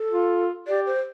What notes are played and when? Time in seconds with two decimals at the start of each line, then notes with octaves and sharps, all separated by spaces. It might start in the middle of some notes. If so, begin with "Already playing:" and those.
Already playing: A4
0.11 F4
0.67 G4 D5
0.86 C5